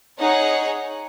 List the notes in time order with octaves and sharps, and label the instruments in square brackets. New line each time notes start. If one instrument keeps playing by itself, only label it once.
[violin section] D#4 G#4 C#5 F#5